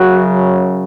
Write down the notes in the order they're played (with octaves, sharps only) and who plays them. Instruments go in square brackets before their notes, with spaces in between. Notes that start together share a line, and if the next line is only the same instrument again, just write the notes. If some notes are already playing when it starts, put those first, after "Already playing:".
Already playing: [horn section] F#2 C#3 F#3 [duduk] F#4